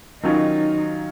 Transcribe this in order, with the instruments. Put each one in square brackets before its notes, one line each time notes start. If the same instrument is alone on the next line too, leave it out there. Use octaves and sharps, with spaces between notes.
[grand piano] D#3 F#3 C#4 F4 [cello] D#4